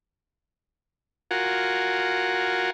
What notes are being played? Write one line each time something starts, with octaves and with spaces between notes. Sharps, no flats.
F4 F#4 A#4 F#5 G#5